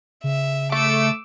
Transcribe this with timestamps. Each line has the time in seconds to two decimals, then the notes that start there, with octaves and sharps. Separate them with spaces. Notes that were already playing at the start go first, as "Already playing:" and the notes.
0.24 C#3 E5
0.72 A3 D6 E6